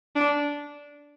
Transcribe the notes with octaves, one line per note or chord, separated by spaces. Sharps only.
D4